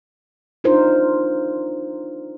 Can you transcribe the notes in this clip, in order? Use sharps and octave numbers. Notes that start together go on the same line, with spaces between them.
D4 D#4 F4 A#4 C5